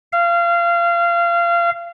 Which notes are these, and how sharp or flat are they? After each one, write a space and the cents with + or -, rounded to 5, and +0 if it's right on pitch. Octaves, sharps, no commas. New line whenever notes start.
F5 -25